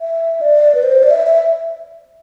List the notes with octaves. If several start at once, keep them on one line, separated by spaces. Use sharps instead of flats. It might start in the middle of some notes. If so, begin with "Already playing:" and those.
E5
D5
B4
C5
D5
E5
E5